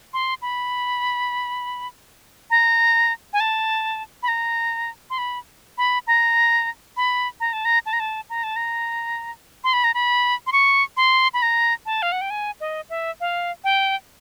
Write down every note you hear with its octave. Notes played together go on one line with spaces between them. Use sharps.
C6
B5
A#5
G#5
A5
B5
A#5
C6
B5
B5
A#5
B5
A#5
A5
A#5
A5
A#5
A5
A#5
A5
A#5
C6
B5
A#5
B5
C6
C#6
C6
B5
A#5
A5
F5
F#5
G5
G#5
D#5
E5
F5
G5